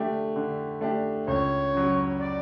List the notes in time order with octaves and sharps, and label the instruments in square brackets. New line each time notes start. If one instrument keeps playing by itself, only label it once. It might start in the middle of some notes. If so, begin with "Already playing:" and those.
Already playing: [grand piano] D3 A3 D4 G4
D3
A3 D4 G4
[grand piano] C#2 [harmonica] C#5
[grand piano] C#3 F#3
[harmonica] D5